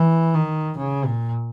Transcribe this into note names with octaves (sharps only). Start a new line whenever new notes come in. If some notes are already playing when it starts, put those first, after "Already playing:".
Already playing: E3
D#3
C#3
A#2